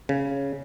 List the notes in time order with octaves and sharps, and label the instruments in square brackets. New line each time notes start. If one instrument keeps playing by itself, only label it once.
[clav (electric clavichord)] C#3